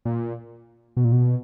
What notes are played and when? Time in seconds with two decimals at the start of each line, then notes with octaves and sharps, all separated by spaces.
0.05 A#2
0.97 B2
1.05 A#2
1.12 B2